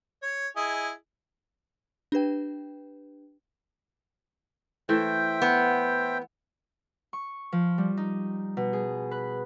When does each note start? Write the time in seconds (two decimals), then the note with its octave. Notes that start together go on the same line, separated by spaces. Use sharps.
0.22 C#5
0.56 E4 G#4 D#5
2.12 D4 G4 B4 G5
4.89 E3 A3 C5 E5 G5
5.42 B3
7.13 C#6
7.52 F3
7.78 G3
7.97 D#4
8.57 B2
8.73 G#4
9.11 B4